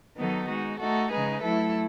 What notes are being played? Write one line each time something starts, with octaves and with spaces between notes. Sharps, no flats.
D#3 F#3 B3 D#4 A4
G#3 D#4 F#4
A3 D#4 F#4 A4
C#3 G#3 D#4 G#4 B4
F#3 A3 E4 A4